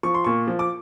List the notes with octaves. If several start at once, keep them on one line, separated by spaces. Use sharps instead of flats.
F3 C#6
C6
A#2 C#6
F3
D6